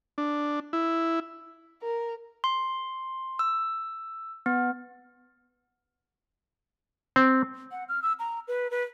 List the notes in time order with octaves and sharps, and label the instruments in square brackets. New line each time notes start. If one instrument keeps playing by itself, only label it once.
[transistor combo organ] D4
E4
[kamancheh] A#4
[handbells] C6
E6
B3
[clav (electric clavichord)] C4
[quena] F#5
F6
E6
A#5
B4
B4